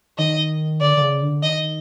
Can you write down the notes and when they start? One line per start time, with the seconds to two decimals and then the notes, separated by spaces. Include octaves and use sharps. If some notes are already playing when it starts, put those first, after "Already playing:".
0.18 D#3 D#5
0.81 D3 D5
0.97 D3
1.01 C#3
1.22 D3
1.43 D#3 D#5